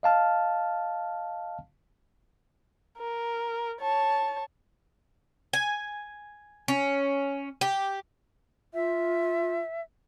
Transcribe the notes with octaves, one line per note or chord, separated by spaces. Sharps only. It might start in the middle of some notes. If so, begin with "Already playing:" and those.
D#5 F5 A5 F6
A#4
C#5 A5
G#5
C#4
G4
F4 E5